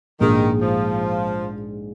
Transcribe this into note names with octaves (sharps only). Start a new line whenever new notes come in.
A#1 G#2 D#3 G#3
F3